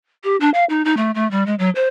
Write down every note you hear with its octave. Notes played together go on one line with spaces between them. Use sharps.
G4
D4
F5
D#4
D#4
A3
A3
G3
G#3
F#3
C5